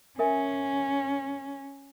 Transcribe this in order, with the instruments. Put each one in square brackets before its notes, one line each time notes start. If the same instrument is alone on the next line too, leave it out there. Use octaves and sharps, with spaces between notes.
[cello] C#4 [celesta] A#4 E5 G#5